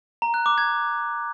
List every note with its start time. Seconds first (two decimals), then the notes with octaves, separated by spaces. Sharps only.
0.22 A#5
0.34 F#6
0.46 D6
0.58 G#6